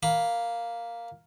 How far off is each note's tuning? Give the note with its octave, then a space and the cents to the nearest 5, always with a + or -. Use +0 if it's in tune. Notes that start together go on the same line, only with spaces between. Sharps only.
A#3 +0 B5 +0